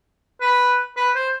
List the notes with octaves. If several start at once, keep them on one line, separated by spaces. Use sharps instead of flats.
B4
B4
C5